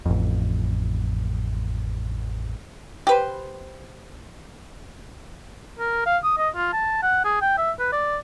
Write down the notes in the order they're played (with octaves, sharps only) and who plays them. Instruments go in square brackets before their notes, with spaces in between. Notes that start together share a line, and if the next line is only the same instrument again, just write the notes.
[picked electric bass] A1 F2
[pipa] G4 B4 C5
[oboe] A#4
F5
D#6
D#5
F4
A5
F#5
G#4
G5
E5
B4
D5